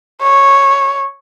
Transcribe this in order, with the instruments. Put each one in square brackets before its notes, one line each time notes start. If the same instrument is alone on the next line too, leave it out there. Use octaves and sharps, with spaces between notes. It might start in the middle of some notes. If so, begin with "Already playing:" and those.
[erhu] C#5